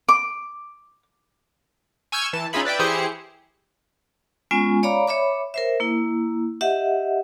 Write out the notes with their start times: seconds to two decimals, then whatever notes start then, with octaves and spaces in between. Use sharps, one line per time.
0.08 D6
2.12 G#5 C#6 E6 F6 G6 G#6
2.33 E3 A5
2.53 C#4 D#4 F4 G#4 E5 B5
2.65 B4 D5 E5 G5
2.79 E3 E4 G4 G#4 C5 C#7
4.51 G#3 B3 C#4 F4 G#5
4.83 C#5 D5 F5 A#5 B5 D6
5.07 C#5 E5 B5 D6
5.54 A#4 C5 E5
5.80 A#3 E4
6.61 G4 D#5 E5 F#5